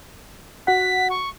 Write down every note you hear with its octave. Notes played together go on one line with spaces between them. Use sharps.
F#4 F#5 B6
C#6